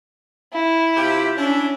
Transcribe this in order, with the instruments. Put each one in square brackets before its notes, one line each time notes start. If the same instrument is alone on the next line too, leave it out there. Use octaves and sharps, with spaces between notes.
[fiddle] E4
[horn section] C3 F4 G4
[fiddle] C#4 [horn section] D4 E4